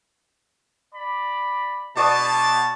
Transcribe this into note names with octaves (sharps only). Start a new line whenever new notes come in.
D5 B5
B2 G#3 B3 D4 D5 A5 C#6 D#6